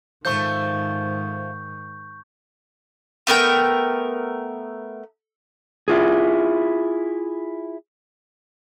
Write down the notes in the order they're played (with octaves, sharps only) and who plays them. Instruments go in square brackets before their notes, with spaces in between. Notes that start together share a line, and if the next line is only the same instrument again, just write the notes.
[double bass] G#2 D#3 [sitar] F3 A3 C5 [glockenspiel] C#6 G6
[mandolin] A3 B3 A#4 G5
[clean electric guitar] E4 F4 G#4